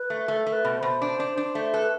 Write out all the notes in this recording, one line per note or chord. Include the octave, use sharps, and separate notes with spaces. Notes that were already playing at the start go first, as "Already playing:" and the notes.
Already playing: B4
A3
A3 A4
A3
B4
B2
C5
B2
D4
D4
D4
A3
A4 B4